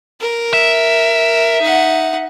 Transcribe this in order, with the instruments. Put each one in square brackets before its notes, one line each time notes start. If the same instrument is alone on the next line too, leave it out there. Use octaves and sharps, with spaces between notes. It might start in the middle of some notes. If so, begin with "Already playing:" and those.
[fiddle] A#4
[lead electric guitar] E5
[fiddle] D#4 F#5